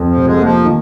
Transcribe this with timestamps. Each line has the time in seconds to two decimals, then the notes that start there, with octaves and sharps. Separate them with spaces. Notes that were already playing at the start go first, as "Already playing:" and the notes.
Already playing: F2
0.09 F3
0.16 F1
0.24 G#2 G#3
0.40 F3 A#3
0.65 D#3